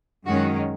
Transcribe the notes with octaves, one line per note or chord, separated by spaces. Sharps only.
F#2 D#3 G#3 C#4 F#4